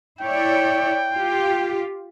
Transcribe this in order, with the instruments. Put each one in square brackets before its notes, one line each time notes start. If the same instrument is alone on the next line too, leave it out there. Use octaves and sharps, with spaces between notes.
[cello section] E4 C#5 D5 [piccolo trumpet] G5
[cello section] F4 G4